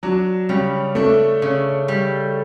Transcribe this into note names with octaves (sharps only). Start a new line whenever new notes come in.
F#3 D4
C#3 G3
A3 D4
C#3
G3